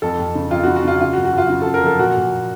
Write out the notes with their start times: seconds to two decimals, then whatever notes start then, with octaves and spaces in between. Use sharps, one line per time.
0.02 F2 A4
0.18 F2
0.35 C#3
0.51 F2 F4
0.63 F#4
0.67 C#3
0.76 F#4
0.84 C#3 F4
1.01 C#3 F4
1.13 F#4
1.17 F#2
1.25 F#4
1.33 F#2 F4
1.49 C#3 F#4
1.62 A4
1.65 F#2
1.74 A#4
1.82 F3 A4
1.99 A#2 F#4
2.16 A#2
2.31 A#2